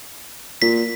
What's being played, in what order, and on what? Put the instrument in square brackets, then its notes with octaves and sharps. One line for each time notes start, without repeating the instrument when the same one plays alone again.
[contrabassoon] A#2 [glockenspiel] B6